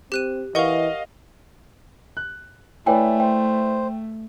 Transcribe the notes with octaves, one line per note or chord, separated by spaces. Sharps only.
C4 G4 F#6 D#7
E3 A#4 D#5 F5 F#5 C#6
F#6
A3 E4 B4 C#5 D5 G5 G#5
C5 G5